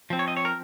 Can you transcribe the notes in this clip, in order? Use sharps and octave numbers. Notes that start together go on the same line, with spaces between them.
F3 C4
C#5
D#5
C#5
A#4